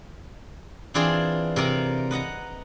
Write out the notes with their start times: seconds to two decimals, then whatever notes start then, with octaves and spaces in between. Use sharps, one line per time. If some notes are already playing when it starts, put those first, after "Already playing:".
0.94 E3 C4 D4 F4 G#4 D5
1.56 C3 A#4 D5 A#5
2.11 B4 D#5 F#5 A#5